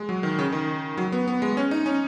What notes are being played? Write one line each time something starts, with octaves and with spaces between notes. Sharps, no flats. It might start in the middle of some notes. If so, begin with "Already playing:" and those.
Already playing: G#3
F#3
D#3
C#3
D#3
F#3
B3
B3
G#3
C#4
D#4
C#4